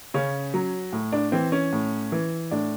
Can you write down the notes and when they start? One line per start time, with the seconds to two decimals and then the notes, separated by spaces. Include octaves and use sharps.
0.14 C#3 C#4
0.54 F#3
0.93 A2
1.12 D4
1.32 E3 C4
1.52 C#4
1.73 A2
2.12 E3
2.51 A2 D4